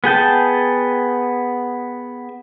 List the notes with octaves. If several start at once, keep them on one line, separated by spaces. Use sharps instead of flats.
B3 G#4 G5 A5